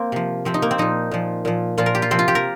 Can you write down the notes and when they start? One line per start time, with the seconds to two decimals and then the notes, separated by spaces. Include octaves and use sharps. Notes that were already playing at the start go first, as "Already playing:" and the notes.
Already playing: A#3 C4
0.12 C3 F3
0.45 C3 F3 C4
0.54 D#4
0.62 A#3
0.71 C4
0.78 A#2 F3 D#4
1.11 A#2 F3
1.45 A#2 F3
1.78 A#2 F3 F4
1.86 A#4
1.95 G4
2.02 F4
2.11 C3 F3 C4
2.19 F4
2.28 G4
2.35 A#4